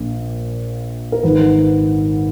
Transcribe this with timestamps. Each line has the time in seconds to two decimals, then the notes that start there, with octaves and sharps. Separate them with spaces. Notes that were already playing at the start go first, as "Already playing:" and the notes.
Already playing: A#1 A#2
1.12 A#4
1.23 G#1 G#2 D#3 B4